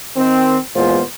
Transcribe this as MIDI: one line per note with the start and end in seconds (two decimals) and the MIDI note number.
0.16 0.56 51
0.16 0.56 60
0.75 1.01 40
0.75 1.01 46
0.75 1.01 56
0.75 1.01 59
0.75 1.01 65
0.75 1.01 72